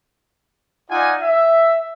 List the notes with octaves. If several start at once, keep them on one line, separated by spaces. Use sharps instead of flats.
D#4 F4 D5 F#5 G#5
E5